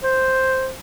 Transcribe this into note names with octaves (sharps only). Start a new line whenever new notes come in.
C5